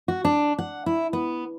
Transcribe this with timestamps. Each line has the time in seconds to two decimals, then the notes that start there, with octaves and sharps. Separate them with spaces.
0.08 F#4
0.25 D4
0.58 F#5
0.86 E4
1.13 B3